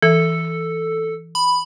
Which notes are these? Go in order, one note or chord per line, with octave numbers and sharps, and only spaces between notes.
E3 A4
B5